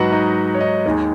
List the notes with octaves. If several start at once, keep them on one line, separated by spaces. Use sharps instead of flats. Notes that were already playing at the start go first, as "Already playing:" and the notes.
Already playing: G#2 F#3 D#4 F#4 B4 F#5
D#4 D#5
C#5
D#4 D#5
D#2 D#3 G#3